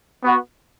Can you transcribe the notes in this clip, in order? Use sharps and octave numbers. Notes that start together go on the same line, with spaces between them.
B3 F#4